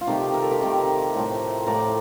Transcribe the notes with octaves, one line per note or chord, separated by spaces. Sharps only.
F4
C3 D#3 A3 D#4 G4
A#4
A4
G4 A#4
C3 D#3 A3
A2 F3 A3
A2 F3 A3 A#4 D5